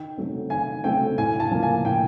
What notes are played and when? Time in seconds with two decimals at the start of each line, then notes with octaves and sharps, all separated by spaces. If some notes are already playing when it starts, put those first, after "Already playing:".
Already playing: D#3 G5
0.17 F#3 A3 C4
0.50 D#3 G#5
0.84 F#3 A3 C4 G5
1.18 A2 G#5
1.40 A5
1.51 F3 A#3
1.63 G#5
1.85 A2 G5